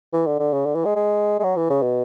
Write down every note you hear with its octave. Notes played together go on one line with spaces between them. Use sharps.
E3
D3
D3
C#3
D3
E3
G#3
G#3
G#3
F#3
E3
C#3
B2